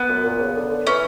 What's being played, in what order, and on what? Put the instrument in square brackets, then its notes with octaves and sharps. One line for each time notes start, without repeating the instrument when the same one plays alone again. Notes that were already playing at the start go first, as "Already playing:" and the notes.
Already playing: [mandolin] B3
[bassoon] F#2
A#2
C#3
D3
D3
[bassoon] E3 [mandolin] C#4